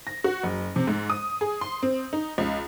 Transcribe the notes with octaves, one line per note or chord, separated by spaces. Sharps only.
A#6
F#4
F#1
C3
G#2
D#6
G#4
C6
C4
D#4
C#2